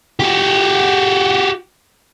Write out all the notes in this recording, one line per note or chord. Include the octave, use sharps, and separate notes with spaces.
F#4 G4